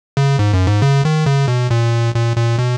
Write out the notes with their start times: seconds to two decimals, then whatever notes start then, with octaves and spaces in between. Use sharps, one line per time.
0.17 C#3
0.39 G#2
0.53 F#2
0.67 G#2
0.82 C#3
1.05 D#3
1.26 C#3
1.48 B2
1.71 A#2
2.15 A#2
2.36 A#2
2.59 B2